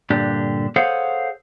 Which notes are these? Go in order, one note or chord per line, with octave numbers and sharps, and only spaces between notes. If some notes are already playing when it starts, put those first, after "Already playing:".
G2 A#2 D3 D4 G4
G#4 A4 C5 C#5 F5 F#5